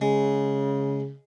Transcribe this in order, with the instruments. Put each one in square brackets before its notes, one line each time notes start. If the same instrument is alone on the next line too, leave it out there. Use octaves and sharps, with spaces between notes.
[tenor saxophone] C#3 [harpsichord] G#3